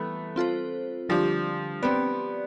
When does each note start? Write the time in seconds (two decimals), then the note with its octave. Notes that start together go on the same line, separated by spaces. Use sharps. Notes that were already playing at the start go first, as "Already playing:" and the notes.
Already playing: E3 G3 A3 B3
0.36 C4 F4 A4 C5
1.09 D3 F3 G3 D4 G4
1.83 B3 C4 G4 D5